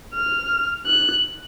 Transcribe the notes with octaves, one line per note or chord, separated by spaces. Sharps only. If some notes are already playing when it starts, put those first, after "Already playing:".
F6
F#6